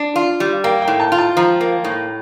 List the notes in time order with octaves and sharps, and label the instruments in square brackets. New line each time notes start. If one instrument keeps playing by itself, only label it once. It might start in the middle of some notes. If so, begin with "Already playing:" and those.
Already playing: [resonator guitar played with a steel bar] D4
F4
G3
[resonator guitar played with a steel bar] A#3 [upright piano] G5
[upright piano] G5
[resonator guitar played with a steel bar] A2
[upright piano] A5
[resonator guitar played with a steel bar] F4
[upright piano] A5
[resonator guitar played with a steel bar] F3 [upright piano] A#5
[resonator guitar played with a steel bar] A#3
A2